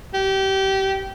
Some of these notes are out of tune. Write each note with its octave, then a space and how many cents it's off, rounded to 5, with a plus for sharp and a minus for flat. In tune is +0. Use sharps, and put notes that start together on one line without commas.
G4 -25